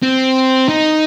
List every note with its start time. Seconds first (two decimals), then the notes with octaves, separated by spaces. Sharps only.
0.02 C4
0.69 D#4